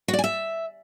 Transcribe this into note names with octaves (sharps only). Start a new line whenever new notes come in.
F#4
D5
G#5
E5